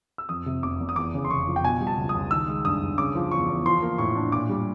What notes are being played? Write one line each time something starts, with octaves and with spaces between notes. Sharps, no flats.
E6
F2 D#6
C3
F1 D6
F1
D#6
E2 D6
C#3
C6
F1 C#6
F3
G5
B2 G#5
G3
A5
C#2
D#6
C#2
D#3 E6
G#3
G2 D#6
G2
C#3 D6
F3
E2 C#6
E2
F3 C6
A#3
A2 C#6
D4
A#2 D6
G3